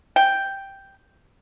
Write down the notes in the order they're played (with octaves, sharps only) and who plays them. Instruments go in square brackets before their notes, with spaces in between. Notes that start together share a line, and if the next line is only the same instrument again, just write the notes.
[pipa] G5